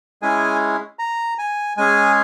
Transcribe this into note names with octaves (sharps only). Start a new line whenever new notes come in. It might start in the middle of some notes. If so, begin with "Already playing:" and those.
G#3 C#4 E4 G#4 G#5
A#5
G#5
G#3 C#4 G#4 G#5